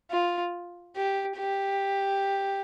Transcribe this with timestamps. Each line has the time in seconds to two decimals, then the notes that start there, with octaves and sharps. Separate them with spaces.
0.10 F4
0.95 G4
1.37 G4